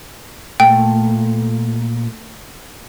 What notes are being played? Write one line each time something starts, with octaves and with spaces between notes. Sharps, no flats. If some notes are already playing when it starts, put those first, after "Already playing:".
A#2 A3 G5